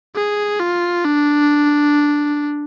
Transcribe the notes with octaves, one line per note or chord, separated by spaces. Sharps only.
G#4
F4
D4